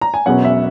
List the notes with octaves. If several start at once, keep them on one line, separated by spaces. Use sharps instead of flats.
A#5
G#5
E1 E2 B2 F#3 C#4 F#5
E5